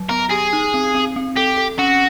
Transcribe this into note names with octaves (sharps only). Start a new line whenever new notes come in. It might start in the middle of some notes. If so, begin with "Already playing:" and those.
Already playing: F#3
B3 A#4
G4 G#4
D#4
C4
C4
C4
G4 A4
A4
C#4 F#4